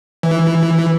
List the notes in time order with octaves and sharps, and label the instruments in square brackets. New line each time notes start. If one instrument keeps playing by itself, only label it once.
[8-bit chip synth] E3